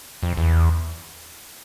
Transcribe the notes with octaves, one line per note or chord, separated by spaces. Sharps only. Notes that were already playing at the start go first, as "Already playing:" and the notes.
F2
E2